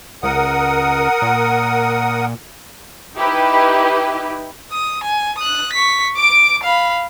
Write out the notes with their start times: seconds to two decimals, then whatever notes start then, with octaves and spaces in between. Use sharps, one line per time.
0.23 C#2 A#4 F#5 D#6
1.22 A#2
3.15 D#4 E4 G4 B4
4.72 D#6
5.03 G#5
5.38 D#6 F#6
5.73 C#6 B6
6.16 D6 D7
6.63 F5 B5